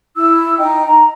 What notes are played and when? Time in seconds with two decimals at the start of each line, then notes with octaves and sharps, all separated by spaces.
0.16 E4 E6
0.58 D#4 D#5 G5
0.86 A#5